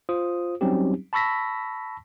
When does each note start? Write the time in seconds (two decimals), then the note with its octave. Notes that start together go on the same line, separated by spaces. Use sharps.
0.09 F4 C5 D#6
0.61 F#3 G3 C4 C#4 D#4 G4
1.13 A5 B5 C#6 E6 A#6 B6